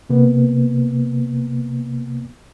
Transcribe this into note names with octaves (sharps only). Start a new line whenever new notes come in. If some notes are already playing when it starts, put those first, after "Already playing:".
C3 A#3 B3